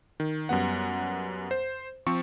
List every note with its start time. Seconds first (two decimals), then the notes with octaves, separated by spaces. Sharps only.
0.20 D#3
0.49 F#2 G3 B3 F#5
1.51 C5
2.07 F3 C4 C#6